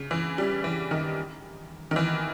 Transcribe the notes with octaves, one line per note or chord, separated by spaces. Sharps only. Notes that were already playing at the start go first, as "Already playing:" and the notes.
Already playing: C#3
E3
G3
E3
D#3
D#3
E3